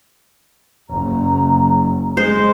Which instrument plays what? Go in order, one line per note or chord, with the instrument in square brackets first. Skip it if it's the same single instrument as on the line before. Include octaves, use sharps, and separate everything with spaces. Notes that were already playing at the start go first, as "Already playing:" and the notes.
[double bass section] F#1 [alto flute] A#5
[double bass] G#3 [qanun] C5